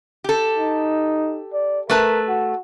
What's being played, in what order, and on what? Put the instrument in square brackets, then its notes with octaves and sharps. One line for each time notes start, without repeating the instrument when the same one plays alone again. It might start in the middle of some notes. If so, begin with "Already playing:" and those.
[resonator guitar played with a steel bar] G4 A4
[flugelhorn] D#4
D5
[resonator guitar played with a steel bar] A3 B4 A5 [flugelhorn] A#4
[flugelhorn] F#4